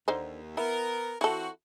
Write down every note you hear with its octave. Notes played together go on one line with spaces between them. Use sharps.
D#2 D3 D#4 C5
B3 E4 A#4
E3 C4 E4 F#4 A4